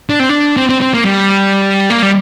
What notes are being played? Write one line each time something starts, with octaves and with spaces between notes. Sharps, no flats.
D4
C4
D4
C4
C4
C4
A#3
G3
A#3
G3